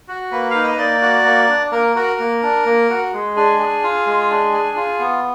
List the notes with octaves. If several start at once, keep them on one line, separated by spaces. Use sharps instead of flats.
F#4
A#3 B4
D#4 F5
D#5
A#3 D5
F#4
A#3
D4
A#3 A#4
F#4 A#4
A#3
D4
A#3
F#4
G#3
D4 G#4
G#4
F4
G#3
D4
G#4
F4
B3